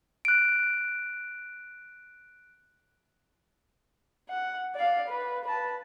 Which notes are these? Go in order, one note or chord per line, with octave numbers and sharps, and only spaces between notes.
F#6 D7
F#5
D5 F5
B4
B4 A5